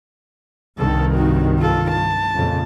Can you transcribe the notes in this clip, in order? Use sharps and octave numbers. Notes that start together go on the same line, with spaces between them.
C2 G2 D#3 A4
D#4 F#4
F4 A4
A5
A#1 F2 C#3